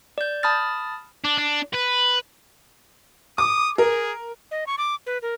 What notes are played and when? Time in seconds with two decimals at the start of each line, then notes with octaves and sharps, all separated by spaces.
0.18 D5 G6
0.43 A5 B5 D#6 F6 A6
1.25 D4
1.38 D4
1.74 B4
3.38 D6 D#6
3.78 G#4 A#4
4.51 D#5
4.67 C#6
4.78 D6
5.06 B4
5.22 A#4